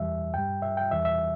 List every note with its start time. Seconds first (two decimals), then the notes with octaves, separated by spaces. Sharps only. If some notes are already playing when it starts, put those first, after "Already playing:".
Already playing: E2 E3 G3 E5
0.34 G2 G3 G5
0.62 E5
0.77 G5
0.91 E2 E3 G3 E5
1.05 E5